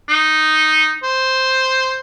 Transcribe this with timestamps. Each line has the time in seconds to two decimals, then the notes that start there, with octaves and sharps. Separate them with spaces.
0.08 D#4
1.03 C5